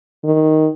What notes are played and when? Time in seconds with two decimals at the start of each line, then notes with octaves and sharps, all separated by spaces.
0.24 D#3